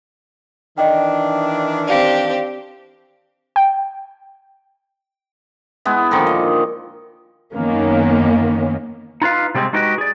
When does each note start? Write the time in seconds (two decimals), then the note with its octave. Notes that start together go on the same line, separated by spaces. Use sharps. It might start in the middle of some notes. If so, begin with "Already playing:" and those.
0.78 D#3 E3 D4 D#5 G5
1.87 C4 G4 D5 F5
3.56 G5
5.85 G#3 B3 E4
6.11 A#2 D3 D#3 F3
6.27 D#5
7.55 F#2 D#3 A#3 B3 C#4
9.22 D#4 F4 B4 F5
9.55 C3 G3 G#3 B3 C4
9.73 G#3 D#4 F#4 G4 B4 D#5
9.98 G#4 D5